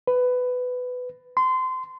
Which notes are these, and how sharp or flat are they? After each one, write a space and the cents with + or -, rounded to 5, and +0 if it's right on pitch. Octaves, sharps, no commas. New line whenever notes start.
B4 +15
C6 -25